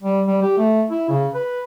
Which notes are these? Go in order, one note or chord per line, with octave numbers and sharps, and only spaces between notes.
G3
G3
G4
A3
E4
C#3
B4